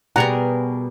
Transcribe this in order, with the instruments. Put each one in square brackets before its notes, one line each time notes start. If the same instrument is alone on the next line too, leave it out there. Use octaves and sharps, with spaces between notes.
[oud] B2 B3 [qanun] G3 G#4 A#4 [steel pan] F#5 A#5